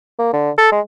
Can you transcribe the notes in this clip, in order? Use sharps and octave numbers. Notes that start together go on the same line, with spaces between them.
A#3
D3
A4
G#3